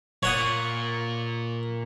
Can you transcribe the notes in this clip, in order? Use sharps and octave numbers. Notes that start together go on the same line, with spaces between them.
A#2 C#5 F#5 D#6